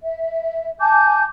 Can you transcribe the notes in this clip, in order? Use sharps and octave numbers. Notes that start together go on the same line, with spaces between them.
E5
G#5 A5 D6 G6